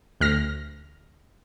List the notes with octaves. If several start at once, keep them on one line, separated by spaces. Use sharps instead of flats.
D2 F6 A#6